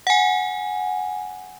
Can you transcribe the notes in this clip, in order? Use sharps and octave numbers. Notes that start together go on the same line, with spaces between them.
F#5 G#5